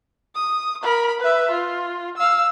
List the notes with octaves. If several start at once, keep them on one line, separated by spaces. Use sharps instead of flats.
D#6
A#4 B5
B4 E5
F4
F5 E6